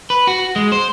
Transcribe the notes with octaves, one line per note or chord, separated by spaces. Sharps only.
B4
F#4
G#3
C5